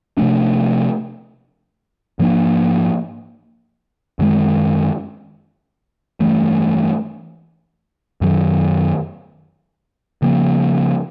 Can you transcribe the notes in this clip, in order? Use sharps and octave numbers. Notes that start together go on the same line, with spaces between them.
C3 F3 A3 D4
G#2 F3 A#3 D4
F#2 D#3 G#3
G2 E3 A3
F#2 D#3 F#3
C#3 F3 A#3